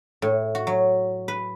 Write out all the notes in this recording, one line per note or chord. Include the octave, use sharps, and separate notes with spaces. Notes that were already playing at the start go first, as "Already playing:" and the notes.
A2
F#4
F#3
B4